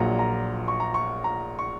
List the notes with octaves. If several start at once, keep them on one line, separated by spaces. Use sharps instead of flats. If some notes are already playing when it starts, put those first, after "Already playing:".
Already playing: A#1 A#2 F#3 A#5
A#5
C#6
A#5
C#6
A#5
C#6